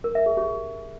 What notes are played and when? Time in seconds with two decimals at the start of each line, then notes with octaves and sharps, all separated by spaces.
0.04 A#4
0.15 E5
0.26 G#4
0.37 G4